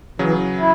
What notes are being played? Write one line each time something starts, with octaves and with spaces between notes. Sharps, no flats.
C#3 E3 F#3
E4